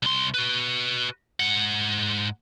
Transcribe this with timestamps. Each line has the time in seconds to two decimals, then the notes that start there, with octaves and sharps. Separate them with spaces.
0.03 C2 C6
0.34 F#4 B4
1.40 G#2 F#5